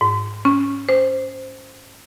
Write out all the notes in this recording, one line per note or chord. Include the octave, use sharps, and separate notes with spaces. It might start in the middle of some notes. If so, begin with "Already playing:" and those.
G#2
C#4
C5